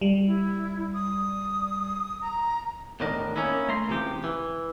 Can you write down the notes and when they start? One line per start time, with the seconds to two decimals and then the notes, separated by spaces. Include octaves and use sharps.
0.01 G3
0.26 E4
0.94 D#6
2.21 A#5
3.00 E2 A2 D#3 D4 A#4 D#5
3.36 A#3 C#4 D#4 E4
3.69 A3 A#5 C6
3.88 C#2 C3 E3 F3 G4
4.24 E3